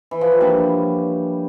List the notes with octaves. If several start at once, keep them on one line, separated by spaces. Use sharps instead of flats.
E3
F3
F#3
F3 G3 A#3 D4 G4